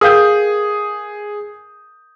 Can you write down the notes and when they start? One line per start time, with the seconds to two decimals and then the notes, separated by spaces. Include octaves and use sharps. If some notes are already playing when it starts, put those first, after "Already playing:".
0.01 G#4 A#4 F5 G5 D#6 G6